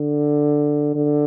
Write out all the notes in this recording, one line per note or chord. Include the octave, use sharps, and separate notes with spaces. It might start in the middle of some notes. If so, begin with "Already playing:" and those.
Already playing: D3
D3